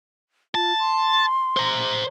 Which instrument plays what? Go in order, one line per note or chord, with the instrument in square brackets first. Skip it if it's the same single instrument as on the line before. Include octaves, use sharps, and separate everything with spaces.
[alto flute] F4 [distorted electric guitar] A5
[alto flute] C6
[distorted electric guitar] C5 A#5